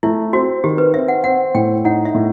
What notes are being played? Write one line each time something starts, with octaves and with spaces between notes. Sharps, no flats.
A3 E4
C4 F#4
D#3 G4
B4
C4 E5
F#5
C4 F#5
A2 G5
D#4 F#5
E5
A2